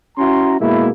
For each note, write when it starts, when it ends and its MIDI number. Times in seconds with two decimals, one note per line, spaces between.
0.18 0.55 61
0.18 0.55 64
0.18 0.55 66
0.18 0.55 82
0.18 0.55 84
0.59 0.90 47
0.59 0.90 56
0.59 0.90 58
0.59 0.90 64